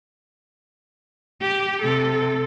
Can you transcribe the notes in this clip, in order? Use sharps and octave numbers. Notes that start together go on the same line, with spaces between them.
G4
C3 A4